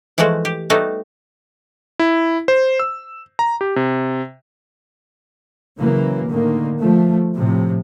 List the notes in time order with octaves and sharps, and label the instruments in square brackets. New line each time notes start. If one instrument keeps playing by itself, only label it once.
[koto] E3 F3 G#3 A3 F#4
G4
G3 A3 B3 D#4 F#4
[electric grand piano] E4
C5
E6
A#5
G4
C3
[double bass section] C#3 E3 F#3 A#3
A2 D3 D#3 A#3
F3 A3
A2 C3 F3